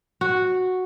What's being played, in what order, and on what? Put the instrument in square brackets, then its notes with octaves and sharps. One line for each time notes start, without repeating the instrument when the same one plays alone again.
[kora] F#4